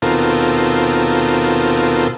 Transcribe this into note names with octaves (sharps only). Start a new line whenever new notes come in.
D#2 B2 C4 F4 A4 A#4